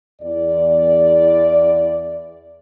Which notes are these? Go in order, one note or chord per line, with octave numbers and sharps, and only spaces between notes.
E2 D5